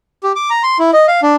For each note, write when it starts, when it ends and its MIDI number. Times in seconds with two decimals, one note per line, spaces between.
0.23 0.32 67
0.36 0.50 86
0.50 0.63 82
0.63 0.78 84
0.79 0.91 64
0.93 1.06 75
1.08 1.21 77
1.23 1.36 62